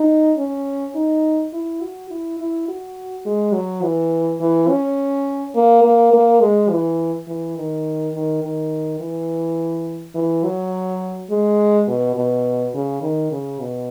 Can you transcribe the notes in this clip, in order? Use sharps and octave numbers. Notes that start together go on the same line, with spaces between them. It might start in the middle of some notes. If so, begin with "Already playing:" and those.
Already playing: D#4
C#4
D#4
E4
F#4
E4
E4
F#4
G#3
F#3
E3
E3
C#4
A#3
A#3
A#3
G#3
E3
E3
D#3
D#3
D#3
E3
E3
F#3
G#3
B2
B2
C#3
D#3
C#3
B2